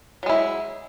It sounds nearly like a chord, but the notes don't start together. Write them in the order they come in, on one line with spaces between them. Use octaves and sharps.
F#3 G#3 E4